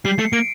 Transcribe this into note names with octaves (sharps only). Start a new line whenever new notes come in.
G3 C7
A3 C#7
A#3 D7